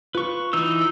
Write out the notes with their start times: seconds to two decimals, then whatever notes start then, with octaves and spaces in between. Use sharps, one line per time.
0.15 F4 B4 C#6
0.53 E3 D#4 E6